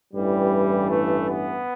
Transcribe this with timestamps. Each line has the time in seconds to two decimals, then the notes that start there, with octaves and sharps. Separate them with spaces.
0.13 A1 G2 E3 G3
0.89 A3
1.28 B3